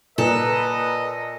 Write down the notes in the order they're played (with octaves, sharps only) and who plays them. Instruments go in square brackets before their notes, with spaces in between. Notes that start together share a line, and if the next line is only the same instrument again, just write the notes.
[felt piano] A#2 [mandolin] A4 [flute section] B4 A#5 [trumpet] D#5